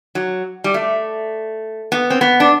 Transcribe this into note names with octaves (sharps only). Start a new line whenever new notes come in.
F#3
G3
A3
B3
C4
B3
D4